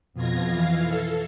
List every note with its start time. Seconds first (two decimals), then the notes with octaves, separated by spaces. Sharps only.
0.13 F2 B2 F4 G#6 A#6
0.49 E3 F5
0.84 A4